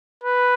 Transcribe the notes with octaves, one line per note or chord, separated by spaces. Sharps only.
B4